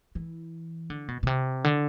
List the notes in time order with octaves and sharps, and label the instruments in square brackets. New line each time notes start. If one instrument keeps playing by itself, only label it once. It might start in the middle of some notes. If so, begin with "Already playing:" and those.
[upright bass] E3
D3
B2
B2
C3
D3